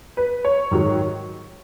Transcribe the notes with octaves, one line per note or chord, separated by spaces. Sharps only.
B4
C#5
G#2 D#3 F#3